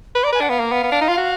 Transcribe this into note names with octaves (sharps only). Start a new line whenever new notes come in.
B4
B5
D5
A#5
B4 G#5
D4 F#5
B3 F5
A#3
B3
B3
D4
D#4
F4
F#4